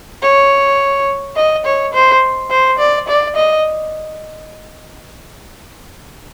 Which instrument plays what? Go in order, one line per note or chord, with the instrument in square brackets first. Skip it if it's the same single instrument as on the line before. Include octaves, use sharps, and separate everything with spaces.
[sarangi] C#5
D#5
C#5
C5
C5
D5
D5
D#5